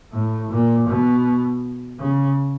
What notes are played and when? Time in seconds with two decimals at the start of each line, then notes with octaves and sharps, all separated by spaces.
0.12 A2
0.50 A#2
0.87 B2
2.00 C#3